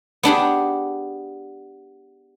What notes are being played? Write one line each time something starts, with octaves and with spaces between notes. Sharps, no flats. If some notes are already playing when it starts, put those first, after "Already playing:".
B3 D4 G4 G#4